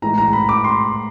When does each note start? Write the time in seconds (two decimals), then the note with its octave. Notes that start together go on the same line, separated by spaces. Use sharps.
0.02 A2 E3 G#3 A#5
0.18 A#5
0.33 B5
0.49 D6
0.64 C6